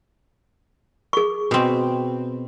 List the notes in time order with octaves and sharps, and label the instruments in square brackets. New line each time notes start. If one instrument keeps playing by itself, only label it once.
[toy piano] G#4 C#6
[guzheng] B2 C4